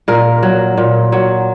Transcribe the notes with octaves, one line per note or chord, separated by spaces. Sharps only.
A#2 A#4
F#3
A#2
F#3